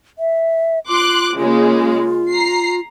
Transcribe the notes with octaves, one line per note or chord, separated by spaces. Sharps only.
E5
F4 C6 D6 F#6
C#3 G#3 A#3 F4
A#5 C7